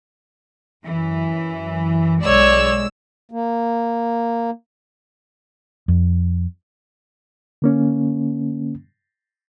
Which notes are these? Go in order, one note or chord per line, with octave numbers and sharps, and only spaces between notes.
F#2 E3
B1 G#3 C#5 D5 E6
A#3
F2
D3 A#3 C#4